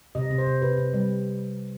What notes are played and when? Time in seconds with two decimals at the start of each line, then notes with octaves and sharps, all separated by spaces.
0.15 C3 D#5
0.31 C3
0.38 C5
0.46 C3
0.61 C3 B4
0.78 C3
0.94 G3